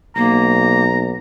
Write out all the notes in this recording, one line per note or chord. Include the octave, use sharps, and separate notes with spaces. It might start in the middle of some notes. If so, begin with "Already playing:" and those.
B1 A#3 A#5